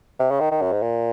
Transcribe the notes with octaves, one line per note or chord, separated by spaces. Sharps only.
C3
C#3
D#3
D#3
F#2
G#2
A#2